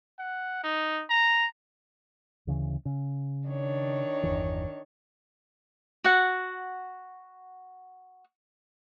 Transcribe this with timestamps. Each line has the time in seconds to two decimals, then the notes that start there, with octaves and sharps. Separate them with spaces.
0.19 F#5
0.64 D#4
1.10 A#5
2.47 D2 C#3 E3
2.85 C#3
3.48 D#3 D4 C#5
4.23 G1 E2 E3
6.04 F#4 F#5